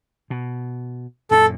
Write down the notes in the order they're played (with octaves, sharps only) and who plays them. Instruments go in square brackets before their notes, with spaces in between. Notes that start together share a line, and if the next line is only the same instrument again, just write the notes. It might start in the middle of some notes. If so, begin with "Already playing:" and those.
[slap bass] B2
[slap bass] F#2 A#2 [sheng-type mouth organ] A4